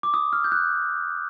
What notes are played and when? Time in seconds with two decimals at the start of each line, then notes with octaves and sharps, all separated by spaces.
0.03 D6
0.14 D#6
0.33 F6
0.44 G6
0.52 F#6